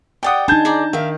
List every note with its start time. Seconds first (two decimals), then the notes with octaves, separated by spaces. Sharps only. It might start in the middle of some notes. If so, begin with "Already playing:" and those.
0.23 G4 D5 F#5 G5 D#6
0.48 D4 D#4 G#4 A5 G6 G#6
0.65 G#4 D5 A#5
0.93 D#3 E5 F5